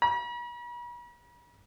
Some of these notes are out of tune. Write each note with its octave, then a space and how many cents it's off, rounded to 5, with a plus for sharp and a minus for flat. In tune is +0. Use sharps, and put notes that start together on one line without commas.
B5 -45